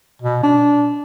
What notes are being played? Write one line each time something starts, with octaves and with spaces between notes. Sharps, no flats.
B2
D4